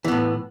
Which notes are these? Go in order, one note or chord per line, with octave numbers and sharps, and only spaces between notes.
A2 E3 B3